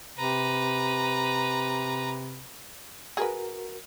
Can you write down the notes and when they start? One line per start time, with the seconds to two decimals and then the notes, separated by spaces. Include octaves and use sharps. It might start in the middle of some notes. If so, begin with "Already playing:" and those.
0.18 C3 B4 A#5
3.17 F#4 G#4 A#4 B4